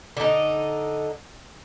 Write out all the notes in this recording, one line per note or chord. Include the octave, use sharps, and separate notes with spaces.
D3 D#4